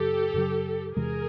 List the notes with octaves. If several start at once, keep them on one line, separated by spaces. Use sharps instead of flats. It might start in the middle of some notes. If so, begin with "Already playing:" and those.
Already playing: F#2 C#3 F#3 G4 A4
F#2 C#3 F#3
E2 C3 E3 G#3 G#4 A#4